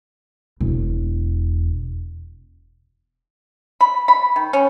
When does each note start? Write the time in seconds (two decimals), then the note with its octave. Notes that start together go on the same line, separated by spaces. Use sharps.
0.60 E1
3.81 B5
4.08 B5
4.36 D#3
4.53 C#4